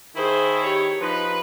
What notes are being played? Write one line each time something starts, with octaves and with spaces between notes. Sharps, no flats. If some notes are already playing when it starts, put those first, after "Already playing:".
D#3 E4 G#4 C5
G4 C#5
F3 D#4 B4